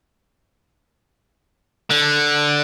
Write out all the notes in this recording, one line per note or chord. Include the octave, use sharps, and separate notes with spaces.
D3